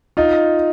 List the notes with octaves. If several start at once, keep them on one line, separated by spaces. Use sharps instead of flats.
D#4 F4